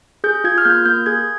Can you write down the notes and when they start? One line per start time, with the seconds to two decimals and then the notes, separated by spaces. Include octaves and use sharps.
0.24 G#4 G6
0.44 F4 G#6
0.58 F6
0.65 A#3 G6
0.86 A#3 G6
1.06 G#4 G#6